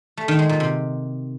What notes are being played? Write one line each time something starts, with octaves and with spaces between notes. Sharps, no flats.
A3
D#3
G#3
A#2
C3